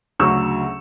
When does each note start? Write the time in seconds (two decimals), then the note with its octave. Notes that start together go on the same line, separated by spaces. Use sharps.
0.19 D2 C#3 F#3 C#6 E6